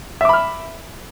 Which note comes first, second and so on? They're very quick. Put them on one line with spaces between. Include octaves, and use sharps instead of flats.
E5 D6 B5 F6